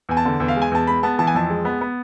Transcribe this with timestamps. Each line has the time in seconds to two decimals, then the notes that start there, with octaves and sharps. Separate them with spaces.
0.09 E2 G#5
0.17 A5
0.25 D3
0.40 E2
0.48 F5
0.56 G#3
0.62 G#5
0.71 E2 A5
0.87 G#3 B5
1.03 B3 A5
1.18 E3 A5
1.27 G#5
1.35 F2 A5
1.50 G#3
1.65 B3
1.81 B3